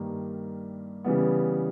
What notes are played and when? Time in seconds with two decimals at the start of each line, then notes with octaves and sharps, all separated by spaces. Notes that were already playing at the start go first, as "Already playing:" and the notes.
Already playing: G2 D#3 G3 A#3
1.04 C#3 E3 G3 B3